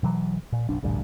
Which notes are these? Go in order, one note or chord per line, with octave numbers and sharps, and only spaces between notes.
B2 E3 F#3
A#2
F#1 B1 D4
A1 D2 G2 A#2